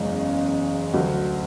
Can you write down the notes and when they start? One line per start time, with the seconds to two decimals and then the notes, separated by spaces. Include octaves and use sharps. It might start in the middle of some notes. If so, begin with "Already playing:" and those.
Already playing: F#1 E2 C#3 G#3
0.94 D2 D3 F#3